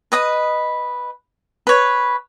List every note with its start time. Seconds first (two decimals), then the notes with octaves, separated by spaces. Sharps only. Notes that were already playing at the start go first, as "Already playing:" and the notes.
0.12 B4 D#5 D#6
1.67 B4 C#5